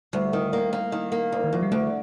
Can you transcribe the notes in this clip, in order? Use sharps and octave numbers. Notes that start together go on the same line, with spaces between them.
D2 G3
D#3
A#3
A#3
D#3
A#3
D2
D#3
D2 F3
G3
D2 A3